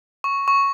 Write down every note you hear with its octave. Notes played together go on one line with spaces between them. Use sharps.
C#6
C#6